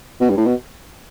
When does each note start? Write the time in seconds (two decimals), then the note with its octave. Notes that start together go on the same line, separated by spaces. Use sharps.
0.21 B2
0.30 G2
0.37 A2
0.46 B2